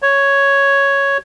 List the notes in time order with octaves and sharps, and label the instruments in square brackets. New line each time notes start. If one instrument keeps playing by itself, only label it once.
[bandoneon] C#5